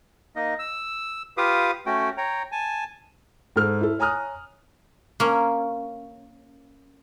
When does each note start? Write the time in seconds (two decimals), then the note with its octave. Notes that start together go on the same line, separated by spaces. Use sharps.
0.36 A#3 D#4 D#5
0.59 E6
1.37 F4 G4 B4 F5 D6 D#6
1.86 A3 C#4 F#4 G5
2.17 C#5 G5 A#5
2.52 G#5 A5
3.56 G#2 A4 F6
3.81 E4 A4
3.99 C#5 G#5 A#5 D#6 F6 F#6
5.20 A#3 C#4